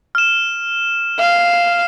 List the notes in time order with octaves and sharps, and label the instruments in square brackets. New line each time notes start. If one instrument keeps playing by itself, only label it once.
[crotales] F6 E7
[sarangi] F5